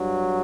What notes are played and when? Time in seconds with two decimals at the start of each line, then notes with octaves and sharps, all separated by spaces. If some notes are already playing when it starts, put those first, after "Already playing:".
Already playing: G2 F#3